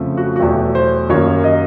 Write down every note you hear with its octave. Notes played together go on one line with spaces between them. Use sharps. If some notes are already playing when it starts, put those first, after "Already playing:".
Already playing: F2 C#3 F3 A3
F#4
F#4
E2 B2 F#3 A3 G4
C5
F#2 D#3 G3 A#3 C#5
D#5